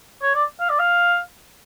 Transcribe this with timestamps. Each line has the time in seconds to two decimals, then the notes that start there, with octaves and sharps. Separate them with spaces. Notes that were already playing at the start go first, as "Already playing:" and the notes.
0.22 C#5
0.35 D5
0.60 F5
0.70 D5
0.79 F5